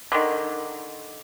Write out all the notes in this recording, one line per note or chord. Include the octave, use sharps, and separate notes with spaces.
D3 D#3